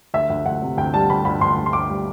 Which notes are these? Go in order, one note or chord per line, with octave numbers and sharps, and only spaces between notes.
D2 E5
D2
D2 F#5
C3
D2 G5
G3 A5
D2 B5
D2 B5
D2 C6
D2
C6
D2 D6
G3